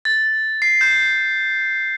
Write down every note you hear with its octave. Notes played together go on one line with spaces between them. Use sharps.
A6
C7
G6